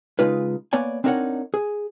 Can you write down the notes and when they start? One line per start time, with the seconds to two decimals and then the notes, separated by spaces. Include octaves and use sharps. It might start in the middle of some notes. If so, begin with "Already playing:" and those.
0.19 C#3 G#3 D#4 F4 B4
0.73 A#3 B3 C#5 D5 G#5
1.04 C4 D4 D#4 A#4 C#5 F#5
1.54 G#4